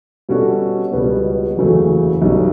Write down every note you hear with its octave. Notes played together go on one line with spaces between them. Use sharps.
B2 G3 C#4 F#4 A4
C#2 B2 G3 B3
F#1 E2 C#3 F#3 A3
B1 B2 G3 C#4